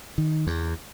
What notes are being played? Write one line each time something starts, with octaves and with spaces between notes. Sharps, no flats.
D#3
E2